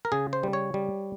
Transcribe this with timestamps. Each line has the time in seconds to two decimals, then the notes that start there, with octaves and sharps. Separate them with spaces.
0.05 A#4
0.12 C#3 G#4
0.33 C5
0.43 G3
0.53 C#5
0.74 G3